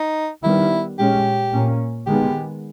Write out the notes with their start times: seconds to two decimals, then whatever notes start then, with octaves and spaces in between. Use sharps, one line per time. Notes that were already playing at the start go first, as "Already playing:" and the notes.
Already playing: D#4
0.44 D#3 G3 B3 E4
0.98 A#2 G#3 C#4 G4
1.53 A#2 A#3 C#4
2.07 D#3 G#3 B3 G4